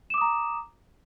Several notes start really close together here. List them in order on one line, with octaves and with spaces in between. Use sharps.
E7 D6 D#6 A#5